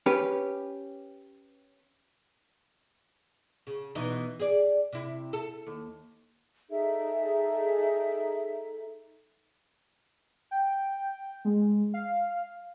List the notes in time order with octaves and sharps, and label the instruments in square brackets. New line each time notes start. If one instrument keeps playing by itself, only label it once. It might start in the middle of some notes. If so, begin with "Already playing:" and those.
[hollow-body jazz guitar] C#4 G4 B4
[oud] C#3
B2 E3 D#4
G#4 D5
C3 E4
A4
D#2
[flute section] D#4 G#4 A4 E5
[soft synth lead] G5
G#3
F5